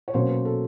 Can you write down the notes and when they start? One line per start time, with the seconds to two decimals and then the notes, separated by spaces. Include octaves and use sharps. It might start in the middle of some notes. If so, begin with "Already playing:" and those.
0.08 C#5
0.14 B2 F#3 A#3 C#4 C5
0.29 B4
0.45 A4